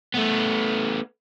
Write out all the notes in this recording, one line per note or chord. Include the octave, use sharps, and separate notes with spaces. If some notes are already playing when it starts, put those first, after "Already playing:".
A3 B3